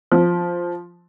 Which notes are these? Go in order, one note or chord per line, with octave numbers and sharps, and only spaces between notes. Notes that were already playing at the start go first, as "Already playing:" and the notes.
F3